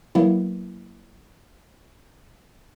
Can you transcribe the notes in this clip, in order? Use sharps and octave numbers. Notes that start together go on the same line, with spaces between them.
F#3 A#3 B3 E4